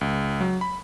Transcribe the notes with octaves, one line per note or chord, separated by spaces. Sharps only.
C#2
F#3
B5